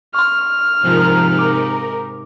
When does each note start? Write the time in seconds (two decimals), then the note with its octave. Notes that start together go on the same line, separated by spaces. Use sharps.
0.15 C6 C#6 F6
0.83 G#2 C3 F3 D#4 A#4
1.39 A#4 D6